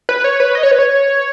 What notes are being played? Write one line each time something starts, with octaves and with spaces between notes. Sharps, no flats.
B4
C#5
B4
D#5
C#5
B4
C#5